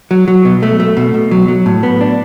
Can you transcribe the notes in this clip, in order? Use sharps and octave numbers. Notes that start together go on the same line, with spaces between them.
F#3
F#3
B2
A3
A3
B2
B2
F#3
F#3
A2
B3
D4